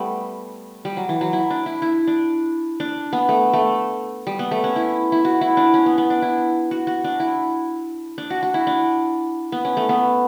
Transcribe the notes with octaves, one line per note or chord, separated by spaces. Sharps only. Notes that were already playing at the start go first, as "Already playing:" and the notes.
Already playing: G3 A3 B3
G3
F#3
E3
F#3
E4
D4
E4
E4
D4
D4
B3
A3
A3
G3
B3
A3
C#4
E4
E4
F#4
E4
D4
C#4
B3
B3
D4
E4
F#4
F#4
D4
E4
D4
F#4
F#4
E4
D4
B3
C#4
A3
B3